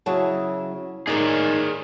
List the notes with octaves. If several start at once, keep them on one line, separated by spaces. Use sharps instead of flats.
C#3 F#3 E4 A5
A2 D#3 G#3 D#4 G#4 D5 A#5